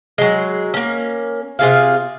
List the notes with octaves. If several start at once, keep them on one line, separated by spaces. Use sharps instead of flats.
F#3 G#3
A#3 C#4
C3 F4 G#4 F5